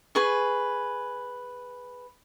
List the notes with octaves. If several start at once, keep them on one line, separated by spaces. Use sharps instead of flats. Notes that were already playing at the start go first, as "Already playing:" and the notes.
G#4 B4 C#6